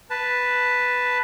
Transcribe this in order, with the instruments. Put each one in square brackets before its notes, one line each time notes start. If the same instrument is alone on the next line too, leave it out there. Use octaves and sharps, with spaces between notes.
[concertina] B4 A5